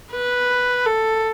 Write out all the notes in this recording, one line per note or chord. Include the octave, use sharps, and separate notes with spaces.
B4
A4